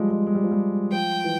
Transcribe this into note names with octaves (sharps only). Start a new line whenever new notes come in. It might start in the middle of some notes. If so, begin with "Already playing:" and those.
Already playing: F3 G3 G#3
G#3
G#3
G3
F3
G3
F3 G5
E3